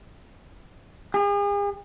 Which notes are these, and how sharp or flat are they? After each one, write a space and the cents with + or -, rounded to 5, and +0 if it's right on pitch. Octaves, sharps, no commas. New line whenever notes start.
G#4 -40